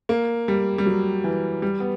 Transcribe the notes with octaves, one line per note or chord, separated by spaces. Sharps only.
A#3
G3
G3
F#3
E3
G3
B3